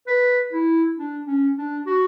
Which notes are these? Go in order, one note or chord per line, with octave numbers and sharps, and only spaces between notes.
B4
E4
D4
C#4
D4
F#4